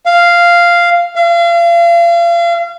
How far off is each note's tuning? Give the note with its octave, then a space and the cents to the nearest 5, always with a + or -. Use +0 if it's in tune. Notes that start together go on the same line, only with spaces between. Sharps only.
F5 -5
F5 -35